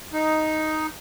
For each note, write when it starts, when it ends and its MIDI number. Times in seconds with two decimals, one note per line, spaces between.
0.14 0.87 63